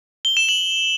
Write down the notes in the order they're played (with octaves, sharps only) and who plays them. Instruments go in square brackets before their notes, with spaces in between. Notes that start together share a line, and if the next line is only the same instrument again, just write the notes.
[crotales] G7
E7
F#7